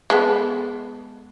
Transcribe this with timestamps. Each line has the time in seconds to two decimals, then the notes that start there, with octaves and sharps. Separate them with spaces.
0.10 G#3 B3 A4